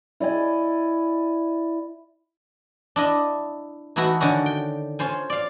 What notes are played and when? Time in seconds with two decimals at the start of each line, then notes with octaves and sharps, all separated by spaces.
0.20 E4 D5 D#5 G#5
2.96 D4 E4 D#5
3.96 E3 A3 D#4 E4 F#4
4.21 D3 D#3 C#4 F#4
4.46 G5
4.99 C#4 F4 C5 G#5
5.30 D5 F5